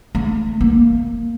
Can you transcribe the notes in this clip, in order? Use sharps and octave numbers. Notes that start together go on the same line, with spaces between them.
A3
A#3